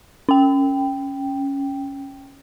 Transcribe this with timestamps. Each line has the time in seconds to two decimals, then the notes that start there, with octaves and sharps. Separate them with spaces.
0.29 C#4 G5